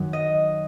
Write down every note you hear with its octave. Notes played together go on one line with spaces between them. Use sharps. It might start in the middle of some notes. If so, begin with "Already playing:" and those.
Already playing: F#2 D#3 F#3
D#5